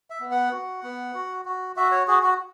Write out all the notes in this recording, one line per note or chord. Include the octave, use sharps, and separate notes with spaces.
E5
B3
F#5
F#4
B3
F#4
F#4
F#4 E5
C#5
F#4 G#4
F#4